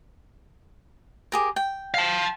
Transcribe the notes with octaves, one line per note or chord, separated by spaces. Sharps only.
G4 G#4 A#4
G5
F5 A5